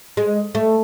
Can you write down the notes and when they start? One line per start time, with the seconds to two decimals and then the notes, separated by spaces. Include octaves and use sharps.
0.17 G#3
0.55 A3